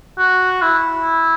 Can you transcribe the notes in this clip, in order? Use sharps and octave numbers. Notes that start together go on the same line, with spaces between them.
F#4
E4